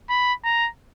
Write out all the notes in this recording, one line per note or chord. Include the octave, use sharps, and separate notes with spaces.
B5
A#5